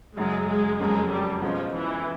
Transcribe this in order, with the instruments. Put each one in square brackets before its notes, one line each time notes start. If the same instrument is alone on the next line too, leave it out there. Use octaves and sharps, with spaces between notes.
[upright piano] F#2 C#3 F#3 [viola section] G#3
[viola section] G#3
[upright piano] F2 C#3 F#3 A#3 C#4 [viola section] G#3
[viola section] G3
[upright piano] B2 G#3 C#4 F4 [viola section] F3
[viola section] E3